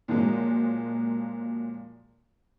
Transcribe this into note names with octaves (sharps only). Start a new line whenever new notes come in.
A#2 F3 F#3 G#3